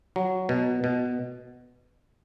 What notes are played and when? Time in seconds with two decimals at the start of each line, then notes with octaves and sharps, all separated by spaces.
0.16 F#3
0.49 B2
0.84 B2